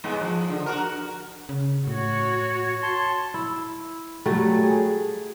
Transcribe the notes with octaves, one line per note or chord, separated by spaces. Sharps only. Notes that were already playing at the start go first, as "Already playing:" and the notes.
G#2 G#3 B3
F3
D3
F#4 A#4
C#3
A2 F#4 C#5
A5 C6
E4
F#3 G3 A3
G#4